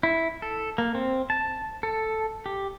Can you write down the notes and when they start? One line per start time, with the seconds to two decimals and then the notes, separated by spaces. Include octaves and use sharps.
0.03 E4
0.42 A4
0.78 A#3
0.95 C4
1.30 A5
1.83 A4
2.46 G4